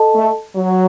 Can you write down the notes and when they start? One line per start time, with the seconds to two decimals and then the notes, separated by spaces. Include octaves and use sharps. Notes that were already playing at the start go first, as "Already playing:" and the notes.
Already playing: A4 D#5 A5
0.14 A3
0.56 F#3